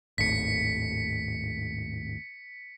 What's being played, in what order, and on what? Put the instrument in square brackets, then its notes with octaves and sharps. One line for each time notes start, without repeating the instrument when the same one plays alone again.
[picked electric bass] G#1 D#2 A2 [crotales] B6 C#7